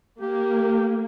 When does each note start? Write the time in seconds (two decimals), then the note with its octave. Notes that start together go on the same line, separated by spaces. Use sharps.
0.21 A#3 G4